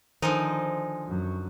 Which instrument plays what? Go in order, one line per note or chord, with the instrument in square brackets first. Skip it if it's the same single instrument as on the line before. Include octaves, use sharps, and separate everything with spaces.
[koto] D3 F3 D#4 [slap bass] D#3 [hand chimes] C5 G#5
[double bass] F#2